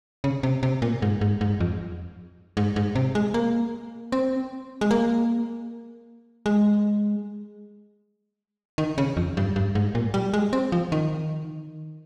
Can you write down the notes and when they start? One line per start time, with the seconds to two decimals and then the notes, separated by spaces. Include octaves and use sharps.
0.24 C#3
0.43 C3
0.63 C3
0.82 A#2
1.02 G#2
1.21 G#2
1.41 G#2
1.60 F2
2.57 G#2
2.76 G#2
2.95 C3
3.15 G#3
3.34 A#3
4.12 C4
4.81 G#3
4.91 A#3
6.46 G#3
8.78 D#3
8.98 C#3
9.17 F2
9.37 G2
9.56 G2
9.75 G#2
9.95 A#2
10.14 G3
10.34 G#3
10.53 C4
10.72 F3
10.92 D#3